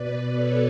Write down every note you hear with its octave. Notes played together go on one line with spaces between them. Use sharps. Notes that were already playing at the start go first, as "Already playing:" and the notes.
Already playing: B2 B4 D5
A4 C#5